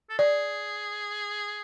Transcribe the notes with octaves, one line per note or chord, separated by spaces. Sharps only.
A4
G#4 D5